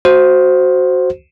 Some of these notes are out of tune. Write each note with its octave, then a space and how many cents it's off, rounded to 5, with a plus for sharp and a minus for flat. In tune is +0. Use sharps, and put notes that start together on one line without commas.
F#4 +0 C5 +0